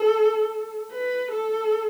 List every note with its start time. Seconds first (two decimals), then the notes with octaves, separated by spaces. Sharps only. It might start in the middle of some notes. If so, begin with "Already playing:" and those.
Already playing: A4
0.92 B4
1.31 A4